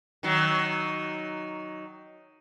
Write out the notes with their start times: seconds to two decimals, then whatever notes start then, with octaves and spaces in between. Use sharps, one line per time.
0.23 D#3 F#3